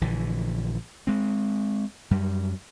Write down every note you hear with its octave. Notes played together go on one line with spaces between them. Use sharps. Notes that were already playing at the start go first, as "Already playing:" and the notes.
A#1 D3 E3
G#3 C4
F#2 G3